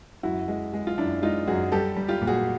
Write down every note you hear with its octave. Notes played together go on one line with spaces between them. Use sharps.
F#2 E4 F#4
G#3
G#3
F4
F#2 D4 E4
G#3 D#4 F4
F#2 F#4 G#4
G3 G4 A4
G3
F4 G4
A#2
F#4 G#4